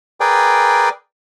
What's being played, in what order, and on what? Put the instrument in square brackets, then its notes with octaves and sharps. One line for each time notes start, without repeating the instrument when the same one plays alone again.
[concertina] G#4 A#4 B4 D5 G5 G#5